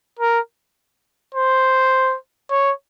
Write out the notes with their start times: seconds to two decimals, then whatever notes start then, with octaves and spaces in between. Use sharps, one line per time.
0.19 A#4
1.35 C5
2.51 C#5